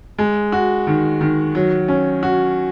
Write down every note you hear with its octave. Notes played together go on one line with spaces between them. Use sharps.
G#3
F#4
D#3
D#3
F#3
C#4
F#4